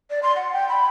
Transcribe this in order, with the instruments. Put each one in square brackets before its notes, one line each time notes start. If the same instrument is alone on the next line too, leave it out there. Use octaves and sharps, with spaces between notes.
[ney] D5
C6
F#5
G5
B5